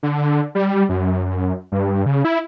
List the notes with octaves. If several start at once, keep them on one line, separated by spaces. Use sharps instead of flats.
D3
G3
F#2
G2
C#3
E4